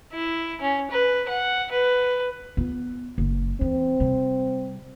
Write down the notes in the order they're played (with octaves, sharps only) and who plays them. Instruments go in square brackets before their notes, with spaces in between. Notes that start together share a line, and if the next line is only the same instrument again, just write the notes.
[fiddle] E4
C#4
B4
F#5
B4
[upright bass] B3 F4
F#1
[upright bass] E3 [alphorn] C4
[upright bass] C3 G3